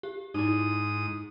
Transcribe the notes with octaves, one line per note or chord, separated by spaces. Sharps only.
G4
G#2 D#4 E4 D#6